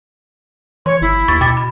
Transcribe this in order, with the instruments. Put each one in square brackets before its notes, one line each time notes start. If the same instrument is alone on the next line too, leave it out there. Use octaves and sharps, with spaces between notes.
[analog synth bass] E3 [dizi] C#5 [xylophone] C6
[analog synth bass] G1 [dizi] E4
[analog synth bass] D#2 [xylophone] C#6 A6
[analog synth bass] B2 [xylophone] G5 D6 A6
[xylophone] B5